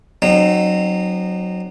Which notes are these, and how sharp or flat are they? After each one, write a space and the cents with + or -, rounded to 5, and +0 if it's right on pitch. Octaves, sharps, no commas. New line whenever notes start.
F#3 +0 C4 +15 D#4 -35